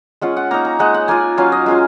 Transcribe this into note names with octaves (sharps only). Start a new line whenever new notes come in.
G#3 C#4 F4 F#5
F#5
A#3 D#4 A#5
A#5
G#3 D#4 F#5
F#5
A#3 F4 G#5
F#3 C#4 F4 F5
D#5
G#3 C#4 F4 F5